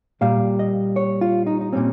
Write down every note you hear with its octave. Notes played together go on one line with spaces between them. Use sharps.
A#2 G3 A#3 F5
D#5
C#5
F4
D#4
D#4
A#2 G3 C4 C#4